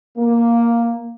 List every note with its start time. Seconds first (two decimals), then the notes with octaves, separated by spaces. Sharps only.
0.18 A#3